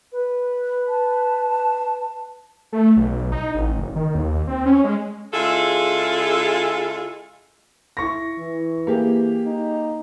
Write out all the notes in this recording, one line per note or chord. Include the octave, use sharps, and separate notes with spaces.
B4
A5
A3
B1
D#4
A1
F#1
D#3
D#2
C4
C#4
G#3
C#3 G#3 E4 F4 G#4 A4
E4 C#6 A#6
E3
A#3 G4 G#4
D#4